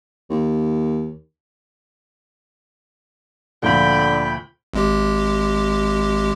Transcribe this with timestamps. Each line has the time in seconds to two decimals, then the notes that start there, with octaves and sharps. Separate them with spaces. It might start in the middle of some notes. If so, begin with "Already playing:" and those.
0.30 D#2
3.63 D2 A#2 D3 F3 G5 B5
4.73 G#1 G#3 G4